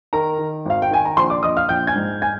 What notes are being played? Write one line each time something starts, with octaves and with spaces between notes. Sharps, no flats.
D#3 A#4 A#5
D#3
G#1 F5
G5
D#3 G#5
A#5
A#1 C5 C6
D5 D6
A#1 D#5 D#6
F5 F6
A#1 G5 G6
G#5 G#6
G#2
G#5 G#6